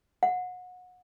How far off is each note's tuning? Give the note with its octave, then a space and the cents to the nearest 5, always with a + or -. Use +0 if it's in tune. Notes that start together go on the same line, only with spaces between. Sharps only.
F#5 -30